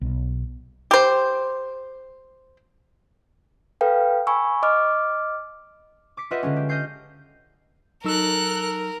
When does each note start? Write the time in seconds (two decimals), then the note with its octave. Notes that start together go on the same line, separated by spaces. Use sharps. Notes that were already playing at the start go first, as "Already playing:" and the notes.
0.01 B1
0.91 G4 C5
3.81 A4 B4 F5 G5
4.27 G#5 B5 C#6 E6
4.63 D#5 D6 F6
6.17 D6 B6 C#7
6.31 F4 G4 B4 D#5 E5 F#5
6.43 D3 G#3 C#4
6.56 G4
6.69 D#5 F6 G6 C7
8.05 F#3 D#4 A4 A#4 E6 F#6